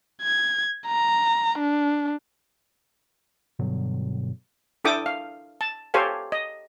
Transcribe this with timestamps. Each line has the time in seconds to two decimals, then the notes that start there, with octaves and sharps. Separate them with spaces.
0.22 G#6
0.87 A#5
1.59 D4
3.59 G2 B2 D3 F#3
4.84 D4 E4 A4 G5 D6 D#6
5.06 F5
5.61 A5
5.94 G4 A4 C5 C#5 F5 G#5
6.32 D#5